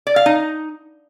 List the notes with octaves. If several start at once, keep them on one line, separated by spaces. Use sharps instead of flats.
D5
F5
D#4